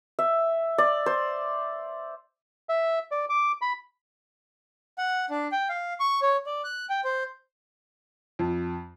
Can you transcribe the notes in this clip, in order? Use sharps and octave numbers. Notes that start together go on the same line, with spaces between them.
E5
D5
C5
E5
D5
D6
B5
F#5
D4
G5
F5
C#6
C#5
D5
F#6
G5
C5
F2